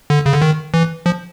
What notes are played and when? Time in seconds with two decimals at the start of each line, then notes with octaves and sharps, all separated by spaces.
0.10 D3
0.26 C#3
0.33 D3
0.42 D#3
0.74 E3
1.06 F3